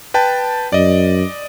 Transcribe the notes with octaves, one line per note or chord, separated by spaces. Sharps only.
B4 G5 A5
F#2 D5 D#5